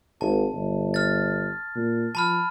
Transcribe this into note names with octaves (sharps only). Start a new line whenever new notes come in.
G#1 A5
G1
F6 A6
A#2
F3 A5 B5 F6